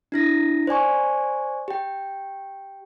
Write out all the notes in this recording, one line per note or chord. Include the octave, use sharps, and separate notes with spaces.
D4 E4 A#6
C5 D5 G#5 C#6
G4 G5